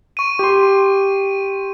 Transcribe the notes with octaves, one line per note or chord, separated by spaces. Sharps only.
C#6 D#7
G4 C6